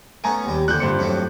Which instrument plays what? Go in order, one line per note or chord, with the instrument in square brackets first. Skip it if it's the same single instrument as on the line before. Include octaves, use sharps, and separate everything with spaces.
[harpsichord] A3 B3 C#4 [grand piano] G#5 A#5
[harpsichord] D#2 G3
[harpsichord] F2 A#2 D3 [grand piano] F#6 G6
[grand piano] G2 C5 C#7
[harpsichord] F2 A2 F#3